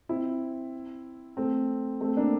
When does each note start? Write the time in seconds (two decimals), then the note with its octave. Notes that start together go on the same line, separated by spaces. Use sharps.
0.09 C4 E4
1.37 A3 C4
2.01 A3 C4
2.17 A#3 D4